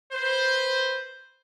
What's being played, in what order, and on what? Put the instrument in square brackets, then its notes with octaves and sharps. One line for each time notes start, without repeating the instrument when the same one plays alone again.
[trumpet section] B4 C5